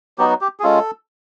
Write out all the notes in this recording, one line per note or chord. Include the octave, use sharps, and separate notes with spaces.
F#3 B3 D#4 F#4 G4
G4
G#4
G#3 C#4 F4 A4